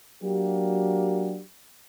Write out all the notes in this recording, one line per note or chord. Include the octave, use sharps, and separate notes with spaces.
F#3 A#3 D4 F#4 G4